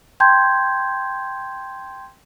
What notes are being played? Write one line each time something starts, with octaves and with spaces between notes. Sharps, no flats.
G5 A5 C6 G6 G#6